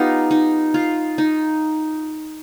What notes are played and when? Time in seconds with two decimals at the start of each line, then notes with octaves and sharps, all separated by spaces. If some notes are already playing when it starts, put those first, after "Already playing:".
Already playing: B3 D#4 F4 G4
0.31 D#4
0.74 F4
1.18 D#4